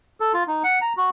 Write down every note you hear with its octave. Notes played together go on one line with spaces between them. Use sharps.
A4
F4
D#4
F#5
A#5
F#4